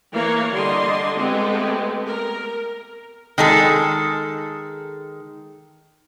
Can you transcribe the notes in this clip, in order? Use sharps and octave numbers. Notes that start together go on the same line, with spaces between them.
E3 A#3 A#4 C#5 F5
D3 G3 D#5 C6
G#3 A3 B3 C4 G4 A4
A#4
D#3 G#3 A4